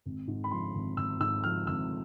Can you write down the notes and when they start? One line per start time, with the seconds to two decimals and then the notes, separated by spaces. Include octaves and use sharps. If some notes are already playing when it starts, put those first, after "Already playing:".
0.06 G#1
0.28 G#2
0.44 B5
0.51 F3 C6
0.75 G#1
0.97 G#1 E6
1.20 G#2 E6
1.44 F3 F6
1.67 G#1 E6